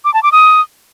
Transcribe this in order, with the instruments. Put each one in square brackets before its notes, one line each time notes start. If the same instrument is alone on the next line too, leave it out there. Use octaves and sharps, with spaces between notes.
[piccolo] D6
A5
D6
D#6